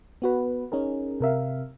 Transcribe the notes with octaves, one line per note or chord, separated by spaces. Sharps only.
B3 F#4 B4
C#4 D#4 G#4 A#4
C3 A#4 E5 F5